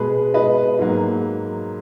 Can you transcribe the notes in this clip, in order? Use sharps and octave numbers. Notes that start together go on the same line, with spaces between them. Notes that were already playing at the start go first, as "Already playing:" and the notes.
Already playing: B2 G#3 G#4 B4
B4 D#5
G#2 F#3 A#3